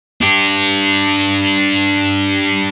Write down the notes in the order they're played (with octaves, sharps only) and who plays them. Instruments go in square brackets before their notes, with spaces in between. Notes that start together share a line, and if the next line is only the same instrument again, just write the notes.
[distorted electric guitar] D4 G4